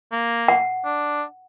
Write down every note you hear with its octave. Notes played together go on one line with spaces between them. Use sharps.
A#3
F#5
D4